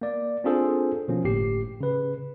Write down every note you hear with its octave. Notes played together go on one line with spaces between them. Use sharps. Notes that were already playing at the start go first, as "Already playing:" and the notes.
A#3 D5
C4 D4 F4 G#4 A4 C5
B2 F3 A#3 C#4
G1 A2 G4 C7
C#3 B4